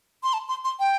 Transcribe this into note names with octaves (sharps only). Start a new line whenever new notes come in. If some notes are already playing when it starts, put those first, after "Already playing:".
C6
A5
C6
C6
G5